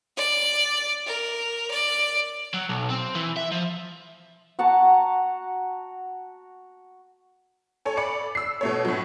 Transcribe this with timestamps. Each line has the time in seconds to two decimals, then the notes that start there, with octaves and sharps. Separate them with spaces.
0.17 D5
1.06 A#4
1.71 D5
2.54 F#3
2.69 B1
2.90 C4
3.15 E3
3.37 E5
3.52 F3
4.59 F#4 F#5 A5 A#5
7.85 A4 C#5 G#5
7.97 D5 B5 D6 C#7
8.35 E6 C7
8.61 B2 A3 C#5
8.85 A2 F#3